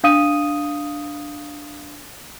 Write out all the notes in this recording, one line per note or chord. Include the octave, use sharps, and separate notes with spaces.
D4 F5 D#6 D#7